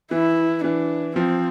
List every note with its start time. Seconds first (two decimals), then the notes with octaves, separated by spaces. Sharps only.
0.11 E3 E4
0.64 E3 D4
1.16 F3 C4